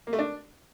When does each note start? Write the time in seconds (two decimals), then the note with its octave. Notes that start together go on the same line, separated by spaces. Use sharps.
0.07 A#3
0.13 A3
0.19 D4